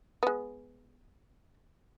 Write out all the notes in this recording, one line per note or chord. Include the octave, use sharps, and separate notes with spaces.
G#3 B3